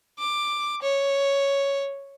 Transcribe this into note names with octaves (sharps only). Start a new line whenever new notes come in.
D6
C#5